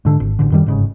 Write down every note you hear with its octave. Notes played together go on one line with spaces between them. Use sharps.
G#2 D3
G#1
A1 D3
F#2 D#3 G3
G1 G#2 C#3